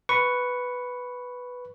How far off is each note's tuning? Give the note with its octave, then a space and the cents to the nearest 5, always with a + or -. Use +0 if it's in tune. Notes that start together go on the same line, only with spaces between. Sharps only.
B4 +0 C#6 +0